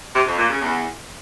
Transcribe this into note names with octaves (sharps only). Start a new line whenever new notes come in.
C3
F2
A#2
C#3
E2